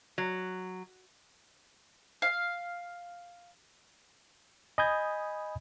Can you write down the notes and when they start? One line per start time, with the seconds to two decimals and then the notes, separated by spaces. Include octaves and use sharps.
0.18 F#3
2.22 F5
4.78 D#5 G#5 B5 D#6 G6 G#6